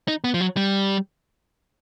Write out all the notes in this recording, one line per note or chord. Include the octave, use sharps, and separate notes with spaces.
D#4
B3
F3
F#3
G3